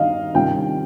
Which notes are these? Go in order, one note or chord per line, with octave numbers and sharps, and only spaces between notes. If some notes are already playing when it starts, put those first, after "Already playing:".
Already playing: D#3 G3 C4 D#5 F5
C3 D#3 G3 C#4 F4 G5